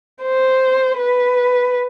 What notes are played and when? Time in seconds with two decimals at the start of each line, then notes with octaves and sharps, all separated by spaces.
0.21 C5
0.97 B4